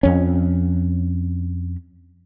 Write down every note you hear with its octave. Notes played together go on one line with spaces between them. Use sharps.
F2 C#4